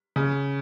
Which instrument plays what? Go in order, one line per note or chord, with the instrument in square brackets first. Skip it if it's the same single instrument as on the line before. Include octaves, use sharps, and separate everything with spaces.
[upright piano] C#3